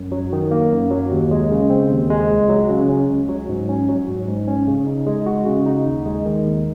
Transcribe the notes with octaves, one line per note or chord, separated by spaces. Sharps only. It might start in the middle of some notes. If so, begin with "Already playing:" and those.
Already playing: F#2
F#3
D#3
A#3
F#2
F#3
D#2
G#3
C#3
C4
D#2
G#3
C#2
F#3
C#3
C#4
C#2
F#3
G#2
C#4
F#3
G#2
G#2
C#4
C#3
D#4
G#3
F#4
C#3
D#4
D#2
G#3
D#3
D#2